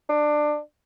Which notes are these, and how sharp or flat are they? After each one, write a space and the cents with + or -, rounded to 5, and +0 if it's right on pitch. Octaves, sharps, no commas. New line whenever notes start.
D4 +20